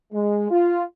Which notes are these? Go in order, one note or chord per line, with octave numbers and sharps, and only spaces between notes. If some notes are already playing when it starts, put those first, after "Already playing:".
G#3
F4